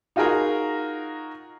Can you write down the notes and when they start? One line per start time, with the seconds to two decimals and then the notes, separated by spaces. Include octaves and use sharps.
0.16 D#4 F4 F#4 G#4 A#4